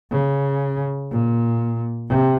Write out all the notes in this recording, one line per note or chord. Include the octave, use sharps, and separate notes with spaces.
C#3
A#2
C3